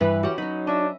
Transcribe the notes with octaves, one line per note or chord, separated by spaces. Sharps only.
G2 E3 B4
C#4 F#4 G4 F#5
F#3 C#4 D#4 B5
D4 D#5 E5